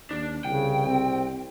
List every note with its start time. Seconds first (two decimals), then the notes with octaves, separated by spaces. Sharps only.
0.11 D#2 D4
0.45 C2 C#3 G5
0.87 C4